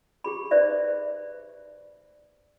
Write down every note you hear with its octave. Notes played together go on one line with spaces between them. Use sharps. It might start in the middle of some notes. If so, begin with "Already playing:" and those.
G4 G#4 B5
D#4 B4 C5 D5 E5